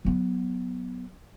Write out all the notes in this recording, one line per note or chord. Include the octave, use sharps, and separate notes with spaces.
F#3 B3